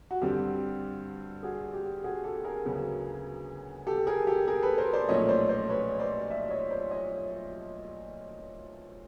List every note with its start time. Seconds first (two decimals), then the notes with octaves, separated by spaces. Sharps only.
0.11 F#4
0.21 G2 D3 G3 C4 G4
1.43 F#4 G#4
1.74 G4
2.04 F#4 G#4
2.24 G4 A4
2.44 G#4 A#4
2.65 D2 C#3 F#3 B3
3.87 G4 A4
4.07 G#4 A#4
4.27 G4 A4
4.47 G#4 A#4
4.63 A4 B4
4.78 A#4 C5
4.93 C5 D5
5.08 B1 A#2 F3 A3 C#4 C#5 D#5
5.29 C5 D5
5.49 C5 D5
5.69 B4 C#5
5.99 C5 D5
6.30 D5 E5
6.50 C#5 D#5
6.71 C5 D5
6.91 C#5 D#5